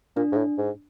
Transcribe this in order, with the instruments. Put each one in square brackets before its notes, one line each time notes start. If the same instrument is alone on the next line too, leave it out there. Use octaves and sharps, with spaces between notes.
[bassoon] A#2 [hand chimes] D4
[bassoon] G#2
A2
G#2